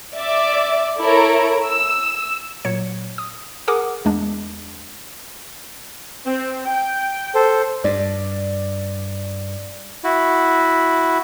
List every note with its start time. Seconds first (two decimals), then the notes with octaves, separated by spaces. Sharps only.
0.15 D5 E5 D6
1.00 E4 A4 A#4 C#5 A#5 D7
1.64 E6
2.65 A#2 F#3 C#5 C#7
3.18 D#6
3.68 G#4 A#4 F#5 G#5 D6 D#6
4.05 E2 G#3 D4
6.26 C4
6.66 G5
7.35 A4 C5
7.84 G2 D5
10.04 E4 F#4